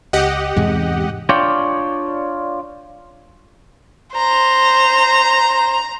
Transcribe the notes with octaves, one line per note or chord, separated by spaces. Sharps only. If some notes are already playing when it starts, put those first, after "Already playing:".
C#2 G4 D#5 F#5
E2 G#2 C3 G#3
D4 F4 C#5 D5 G5
C5 A#5